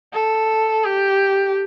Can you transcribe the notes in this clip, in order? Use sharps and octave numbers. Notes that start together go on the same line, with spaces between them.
A4
G4